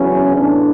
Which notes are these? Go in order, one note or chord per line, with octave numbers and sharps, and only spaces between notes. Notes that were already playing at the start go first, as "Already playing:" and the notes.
Already playing: E2 C#3 F#3 C#4 E4
A2 E3 B3 D4